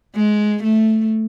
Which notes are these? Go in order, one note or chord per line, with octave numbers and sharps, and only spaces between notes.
G#3
A3